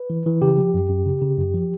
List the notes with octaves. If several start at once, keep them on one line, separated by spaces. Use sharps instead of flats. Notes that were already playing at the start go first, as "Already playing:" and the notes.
Already playing: B4
E3
E3
C#3 G4
F3
F#2
F#2
C#3
C#3
F#2
F3